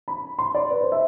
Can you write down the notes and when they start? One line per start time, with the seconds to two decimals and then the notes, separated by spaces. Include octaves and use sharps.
0.08 B5
0.39 C6
0.55 D5
0.70 B4
0.81 C5
0.92 E5